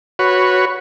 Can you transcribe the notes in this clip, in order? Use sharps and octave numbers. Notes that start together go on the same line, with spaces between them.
F#4 B4 C#5